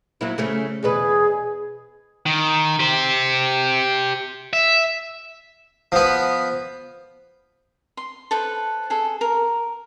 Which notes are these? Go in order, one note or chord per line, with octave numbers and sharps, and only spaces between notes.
F#3 A#3 E4
C#3 A3 C#4
E2 B2 G#4 B4
D#3
G4 C5
E5
F3 B3
C6
A4 B4 C5
G#4 A4
A#4